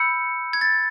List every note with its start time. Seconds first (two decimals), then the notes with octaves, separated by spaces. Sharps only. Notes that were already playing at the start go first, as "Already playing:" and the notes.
Already playing: B5 E6 G6 C#7
0.53 G#6
0.61 A6